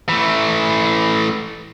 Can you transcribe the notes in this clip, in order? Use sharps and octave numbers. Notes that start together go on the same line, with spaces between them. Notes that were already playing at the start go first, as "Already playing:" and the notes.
E3 A3